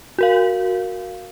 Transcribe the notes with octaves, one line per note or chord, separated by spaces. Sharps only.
F#4 A#4 F5